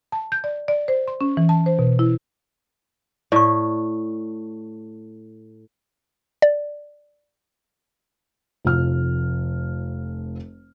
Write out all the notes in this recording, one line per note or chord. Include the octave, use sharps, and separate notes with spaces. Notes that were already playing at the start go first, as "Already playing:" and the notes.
A5
G6
D5
D5
C5
C6
C#4
E3
A5
C5
B2
E4
A2 D5 C#6
D5
F1 F3 F6